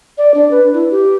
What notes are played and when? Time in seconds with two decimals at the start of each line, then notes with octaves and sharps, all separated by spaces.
0.18 D5
0.34 D4
0.51 B4
0.74 E4
0.91 G4